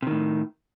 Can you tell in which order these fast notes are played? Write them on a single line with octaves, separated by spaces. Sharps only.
C3 D#3 A2